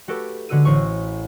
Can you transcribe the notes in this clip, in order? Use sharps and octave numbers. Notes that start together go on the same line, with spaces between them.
A3 F#4 G4 A4 B4
D3 G#3 F#4 B4 E6 D#7
A1 C5 C#6